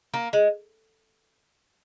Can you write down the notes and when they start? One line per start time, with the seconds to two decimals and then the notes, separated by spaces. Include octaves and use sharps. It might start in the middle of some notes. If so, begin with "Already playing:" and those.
0.14 A#3
0.33 G#3